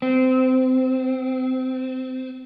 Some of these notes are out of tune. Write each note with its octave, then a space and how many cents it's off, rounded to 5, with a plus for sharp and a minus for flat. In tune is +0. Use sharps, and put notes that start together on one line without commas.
C4 -20